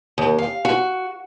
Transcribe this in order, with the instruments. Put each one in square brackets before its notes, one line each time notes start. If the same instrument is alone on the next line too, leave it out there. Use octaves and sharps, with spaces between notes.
[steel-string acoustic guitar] D#2
F5
F#4